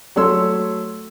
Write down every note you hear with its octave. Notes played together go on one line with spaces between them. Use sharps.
F#3 A3 C#5 C6 E6